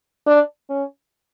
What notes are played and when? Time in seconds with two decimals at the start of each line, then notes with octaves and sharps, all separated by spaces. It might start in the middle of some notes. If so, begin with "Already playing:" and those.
0.27 D4
0.70 C#4